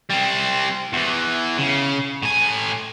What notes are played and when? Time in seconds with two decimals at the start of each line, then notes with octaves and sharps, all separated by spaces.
0.10 G3 C4
0.93 E2 E3
1.58 C#3
2.23 A2 G#5